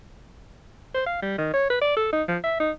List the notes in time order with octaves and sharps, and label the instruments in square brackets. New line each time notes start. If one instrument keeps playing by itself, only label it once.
[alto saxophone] C5
F5
G3
D#3
C#5
B4
D5
A4
D#4
F3
E5
D#4